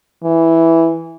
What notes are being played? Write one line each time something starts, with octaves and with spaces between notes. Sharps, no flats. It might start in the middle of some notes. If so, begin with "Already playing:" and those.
E3